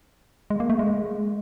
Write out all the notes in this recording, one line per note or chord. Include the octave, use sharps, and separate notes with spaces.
G#3
A#3
A3
G#3